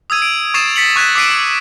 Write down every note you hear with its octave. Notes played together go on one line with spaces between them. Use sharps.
D#6 E6 G#6 D#7
D7
C#6 D#6 G#6 A6 C7 E7
A6 B6 C#7 F#7
C#6 F#6 G#6 B6 E7
D6 E6 B6 C7 D7 D#7